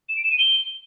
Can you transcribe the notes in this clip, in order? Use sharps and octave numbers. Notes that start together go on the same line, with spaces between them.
E7
D7
E7
D#7
G7